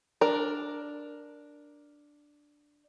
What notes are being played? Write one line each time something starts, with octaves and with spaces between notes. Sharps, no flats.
D4 A#4